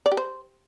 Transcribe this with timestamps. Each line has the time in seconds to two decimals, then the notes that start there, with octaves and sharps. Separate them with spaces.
0.06 D5
0.11 G4
0.17 C5